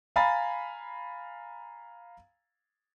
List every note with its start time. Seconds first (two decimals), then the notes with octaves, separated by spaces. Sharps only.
0.16 F5 G#5 A#5 B5 A6